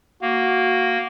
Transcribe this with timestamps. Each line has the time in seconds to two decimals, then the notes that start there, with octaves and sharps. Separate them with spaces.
0.22 A#3 F#4